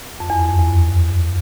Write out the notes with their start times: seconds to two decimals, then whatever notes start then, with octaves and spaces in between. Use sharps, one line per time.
0.20 F2
0.30 E2
0.39 F#2
0.49 F2
0.59 E2